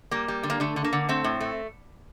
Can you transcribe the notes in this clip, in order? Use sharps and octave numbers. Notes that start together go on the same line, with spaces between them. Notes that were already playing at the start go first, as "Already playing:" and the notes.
G3 A#3
G3
D3
A#3
D3 A3
D3
A#3
D3
A3 C4
A2
A3